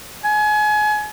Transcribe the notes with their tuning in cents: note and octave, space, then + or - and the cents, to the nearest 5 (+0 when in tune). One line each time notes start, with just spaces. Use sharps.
G#5 +30